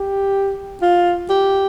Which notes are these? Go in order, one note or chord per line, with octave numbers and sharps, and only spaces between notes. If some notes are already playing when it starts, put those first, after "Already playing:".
Already playing: G4
F4
G4